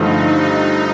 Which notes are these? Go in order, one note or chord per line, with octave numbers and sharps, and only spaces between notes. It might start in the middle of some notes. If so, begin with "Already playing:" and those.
Already playing: G2 D3 F3 A3 D#4
D#4